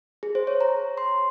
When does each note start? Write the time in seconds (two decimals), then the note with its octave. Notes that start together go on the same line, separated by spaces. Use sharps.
0.23 G#4
0.35 C5
0.47 C#5
0.61 A#5
0.98 C6